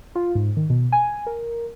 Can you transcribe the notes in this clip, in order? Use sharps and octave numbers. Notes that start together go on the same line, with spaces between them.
F4
G#2
D#3
B2
G#5
A#4